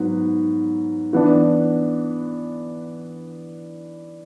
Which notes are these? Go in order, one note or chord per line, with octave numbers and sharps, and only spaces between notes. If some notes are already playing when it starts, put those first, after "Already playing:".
Already playing: G#2 F#3 B3
E3 B3 D4